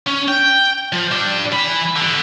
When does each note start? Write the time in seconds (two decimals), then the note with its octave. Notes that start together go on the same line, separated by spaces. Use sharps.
0.07 C#4
0.28 G5
0.93 F3
1.11 D4 G4
1.52 E3 B5
1.96 D3 B3